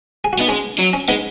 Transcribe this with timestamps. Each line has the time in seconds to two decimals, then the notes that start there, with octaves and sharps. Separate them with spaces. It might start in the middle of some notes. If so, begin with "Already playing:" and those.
0.24 G#4
0.33 F#4
0.39 B3 D#4
0.48 G#3 C#4
0.79 F#3
0.93 C#4
1.08 G#3 B3 D#4